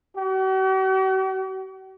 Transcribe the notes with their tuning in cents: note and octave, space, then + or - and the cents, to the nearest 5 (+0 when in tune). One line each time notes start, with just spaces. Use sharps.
F#4 +45